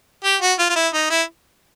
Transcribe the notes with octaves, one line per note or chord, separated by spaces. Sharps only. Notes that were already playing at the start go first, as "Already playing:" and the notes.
G4
F#4
F4
F4
E4
D#4
E4